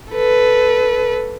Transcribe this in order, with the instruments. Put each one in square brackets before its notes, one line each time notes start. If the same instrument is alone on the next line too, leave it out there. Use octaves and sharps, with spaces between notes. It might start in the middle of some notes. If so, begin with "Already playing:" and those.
[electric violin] A4 B4